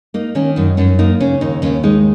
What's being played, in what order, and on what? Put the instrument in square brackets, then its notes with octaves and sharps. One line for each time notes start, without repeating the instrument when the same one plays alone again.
[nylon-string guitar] A#3 D#4
D#3 C#4
F#2 D#4
F#2 C#4
A#3 D#4
C#3 C#4
D#2 D#4
D#2 C#4
G#3 D#4